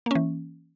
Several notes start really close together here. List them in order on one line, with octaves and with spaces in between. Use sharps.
A#3 C#4 E3